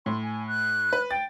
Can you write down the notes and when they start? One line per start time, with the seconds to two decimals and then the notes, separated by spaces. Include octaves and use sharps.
0.06 A2 C6
0.23 G#5
0.48 F#6
0.93 B4
1.11 G5 A6